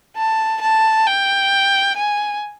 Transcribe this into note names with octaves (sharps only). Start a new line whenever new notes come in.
A5
A5
G5
G#5